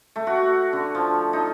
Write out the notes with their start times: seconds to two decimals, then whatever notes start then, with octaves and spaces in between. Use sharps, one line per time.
0.16 A3
0.27 F#4
0.73 D3
0.95 F3
1.33 D#4